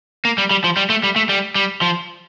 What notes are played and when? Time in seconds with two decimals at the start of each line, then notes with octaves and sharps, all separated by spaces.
0.25 A#3
0.38 G3
0.51 G3
0.64 F3
0.77 G3
0.90 A3
1.03 G3
1.16 A3
1.29 G3
1.55 G3
1.82 F3